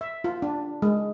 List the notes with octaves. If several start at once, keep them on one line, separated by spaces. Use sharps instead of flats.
E5
F4
D4
G#3